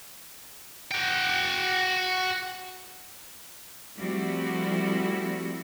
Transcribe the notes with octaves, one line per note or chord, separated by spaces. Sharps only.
F#4 G5
F3 G3 A3 C4 E4 F#4